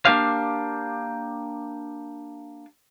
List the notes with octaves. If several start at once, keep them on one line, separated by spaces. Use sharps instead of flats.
A#3 D4 G4 F5